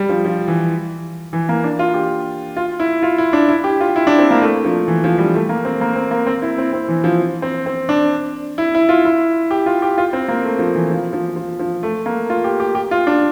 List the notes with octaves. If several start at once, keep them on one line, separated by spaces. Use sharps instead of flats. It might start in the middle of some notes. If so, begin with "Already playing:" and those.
Already playing: G3
F3
F3
E3
E3
A#3
D4
F4
G4
F4
E4
F4
E4
D4
E4
G4
F4
E4
D4
C4
A#3
A3
F3
E3
F3
G3
A3
A#3
C4
A#3
C4
A#3
C4
E4
C4
C4
E3
F3
C4
C4
D4
E4
E4
F4
E4
G4
F4
G4
F4
C4
A#3
A3
F3
E3
F3
F3
F3
F3
A3
A#3
F4
G4
G4
G4
F4
D4